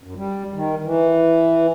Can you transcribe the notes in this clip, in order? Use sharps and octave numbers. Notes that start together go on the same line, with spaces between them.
F#2
G3
D#3
E3